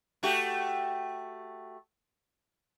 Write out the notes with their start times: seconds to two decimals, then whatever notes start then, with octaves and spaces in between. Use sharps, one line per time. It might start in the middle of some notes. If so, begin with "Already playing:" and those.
0.23 A3 F#4 G4